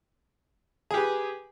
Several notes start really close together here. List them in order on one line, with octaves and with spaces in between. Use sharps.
G#4 G4 B4